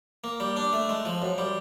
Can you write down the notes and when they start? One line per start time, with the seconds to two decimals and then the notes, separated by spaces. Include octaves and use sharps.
0.24 A#3
0.40 G3
0.56 D4
0.73 A3
0.89 G#3
1.05 F3
1.22 F#2
1.38 G3